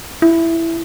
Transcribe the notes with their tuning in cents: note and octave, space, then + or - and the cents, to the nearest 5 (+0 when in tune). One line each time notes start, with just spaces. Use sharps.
E4 +5